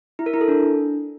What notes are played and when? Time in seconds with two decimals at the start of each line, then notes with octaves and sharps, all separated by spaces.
0.19 E4
0.26 A#4
0.34 E4
0.41 A4
0.48 D4